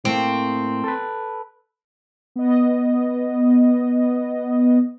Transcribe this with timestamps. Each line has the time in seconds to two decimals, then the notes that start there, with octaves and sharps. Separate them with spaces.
0.05 A2 A3 A#3 C4
0.84 A4 B4
2.36 B3 D#5